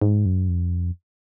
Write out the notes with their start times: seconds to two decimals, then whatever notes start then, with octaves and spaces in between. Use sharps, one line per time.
0.02 G#2
0.26 F#2
0.48 F2